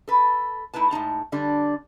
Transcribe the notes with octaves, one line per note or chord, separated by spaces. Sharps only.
A4 B4
A3 D#4 E4 B4 A5
A2 G#3 D#4 A5
D3 G3 D4